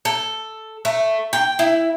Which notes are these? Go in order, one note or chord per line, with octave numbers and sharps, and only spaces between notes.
A4
A3
G5
E4